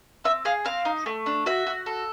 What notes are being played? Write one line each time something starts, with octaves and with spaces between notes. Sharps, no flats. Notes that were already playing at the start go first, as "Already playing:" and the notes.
C4 E5
G#4 F5
C4 F5
D#4
A3
D4
F#4 E5
F#4
A4